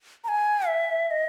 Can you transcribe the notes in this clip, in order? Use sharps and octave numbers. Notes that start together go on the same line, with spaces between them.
A#5
G#5
E5
D#5